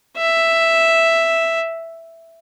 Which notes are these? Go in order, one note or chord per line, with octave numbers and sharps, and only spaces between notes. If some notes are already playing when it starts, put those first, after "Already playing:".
E5